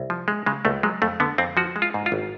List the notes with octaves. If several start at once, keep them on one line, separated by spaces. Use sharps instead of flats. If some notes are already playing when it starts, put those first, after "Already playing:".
Already playing: C2
F3
G#3
C#3 G#3
C#2 A3
F#3 G#3
F2 A3
D3 B3
F2 C4
F3 F#4
G#3
F4
G#2
F4
G#1